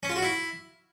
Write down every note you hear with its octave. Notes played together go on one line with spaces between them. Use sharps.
C#4
F4
F#4
E4